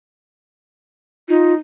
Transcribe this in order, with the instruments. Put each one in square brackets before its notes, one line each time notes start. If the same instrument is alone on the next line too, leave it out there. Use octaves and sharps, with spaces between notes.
[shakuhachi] D#4 [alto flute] F4